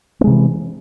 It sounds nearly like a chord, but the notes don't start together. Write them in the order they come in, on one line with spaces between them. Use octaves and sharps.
B3 G#3 C3 E3